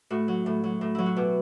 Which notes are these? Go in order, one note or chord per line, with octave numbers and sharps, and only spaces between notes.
A2 F#4
F#3
A2
F#3
A2
F#3 E4
F#4
B2 G4